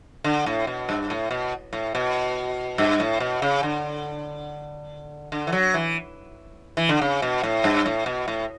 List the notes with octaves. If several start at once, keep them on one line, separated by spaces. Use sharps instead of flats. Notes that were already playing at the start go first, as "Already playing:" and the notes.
D3
A2
B2
G2
A2
B2
A2
B2
G2
A2
B2
C#3
D3
D3
E3
F#3
E3
E3
D3
C#3
B2
A2
G2
A2
B2
A2